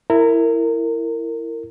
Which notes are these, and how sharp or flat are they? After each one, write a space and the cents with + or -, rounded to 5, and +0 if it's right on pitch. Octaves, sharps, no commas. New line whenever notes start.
E4 +5 A#4 -20